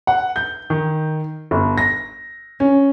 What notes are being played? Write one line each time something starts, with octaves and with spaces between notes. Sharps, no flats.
F#5
G6
D#3
G1
A#6
C#4